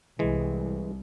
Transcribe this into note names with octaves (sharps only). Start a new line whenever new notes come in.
C2 E3 G#3